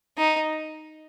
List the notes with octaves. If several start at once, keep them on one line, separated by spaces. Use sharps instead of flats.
D#4